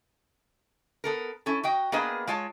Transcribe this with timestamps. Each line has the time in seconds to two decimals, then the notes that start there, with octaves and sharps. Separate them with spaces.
1.04 B3 A4 A#4
1.46 C#4 E4 A4
1.64 F#4 D#5 G5
1.92 A#3 B3 D4 G#4 B4 D#5
2.27 G#3 F4 C#5 A5